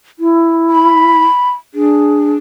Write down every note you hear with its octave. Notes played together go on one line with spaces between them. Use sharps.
E4
B5
D4 G#4